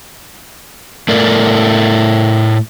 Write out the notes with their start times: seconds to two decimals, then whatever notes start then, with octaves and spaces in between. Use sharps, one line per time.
1.08 A2 A3 A#4 D5